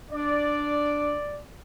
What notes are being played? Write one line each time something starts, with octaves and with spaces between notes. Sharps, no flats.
D4 D5